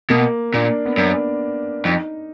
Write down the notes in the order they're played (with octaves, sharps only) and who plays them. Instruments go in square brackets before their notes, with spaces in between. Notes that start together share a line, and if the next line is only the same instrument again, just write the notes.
[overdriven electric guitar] B2 [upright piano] A#3
[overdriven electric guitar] A#2 [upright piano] D4
[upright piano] B3
[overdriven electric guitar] F#2 [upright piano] D4
[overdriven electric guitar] F2 [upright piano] D#4